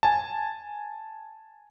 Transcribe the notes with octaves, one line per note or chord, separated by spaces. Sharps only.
G#5 A5